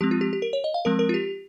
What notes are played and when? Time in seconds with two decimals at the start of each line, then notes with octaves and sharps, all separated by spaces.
0.01 F3 G#3 C4 G4
0.11 F4
0.21 G4
0.33 G4
0.42 A#4
0.53 C#5
0.64 D#5
0.74 F5
0.85 F3 G#3 C4 A#4
0.99 A#4
1.09 F4
1.14 G4